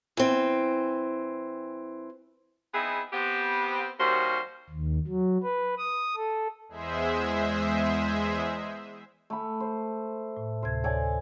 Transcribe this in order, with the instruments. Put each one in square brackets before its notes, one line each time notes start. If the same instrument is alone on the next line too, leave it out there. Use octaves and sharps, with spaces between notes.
[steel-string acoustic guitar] E3 C4
[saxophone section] B3 C4 D#4 E4 G#4
B3 C4 G4
D#2 D#3 G3 C#4 F#4 C5
[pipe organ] D#2
F#3
B4
D#6
A4
[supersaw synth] E2 G#3 G#4 C5 E5
[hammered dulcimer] A3 B5
C5
[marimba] A2
[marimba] D2 C3 G#6 [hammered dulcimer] C5
[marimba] D2 C#5 G#6 [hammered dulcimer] A4 D5 G#5